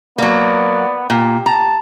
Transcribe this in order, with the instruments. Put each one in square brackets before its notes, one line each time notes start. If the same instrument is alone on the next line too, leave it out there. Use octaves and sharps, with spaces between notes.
[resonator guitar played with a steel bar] F#3 A#3 [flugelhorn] B3 [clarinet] D5
[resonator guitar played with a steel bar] A#2 [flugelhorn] G4
[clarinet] A5 [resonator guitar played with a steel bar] A#5